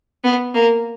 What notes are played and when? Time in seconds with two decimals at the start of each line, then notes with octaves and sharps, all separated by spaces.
0.24 B3
0.54 A#3